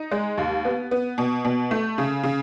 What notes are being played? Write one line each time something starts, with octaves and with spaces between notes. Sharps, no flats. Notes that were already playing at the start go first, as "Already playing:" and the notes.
Already playing: D#4
G#3
D#2
B3
B3
B2
B2
A3
C#3
C#3